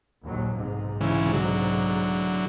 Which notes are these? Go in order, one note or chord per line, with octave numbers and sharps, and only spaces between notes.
A#1 D#2 F#3
B1 G#2 C3
C#3 E3 G#3
D3 F#3